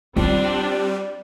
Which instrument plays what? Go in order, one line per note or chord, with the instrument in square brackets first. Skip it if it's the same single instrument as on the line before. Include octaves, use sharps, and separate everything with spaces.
[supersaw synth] G3 [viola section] C4 D4 [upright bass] F4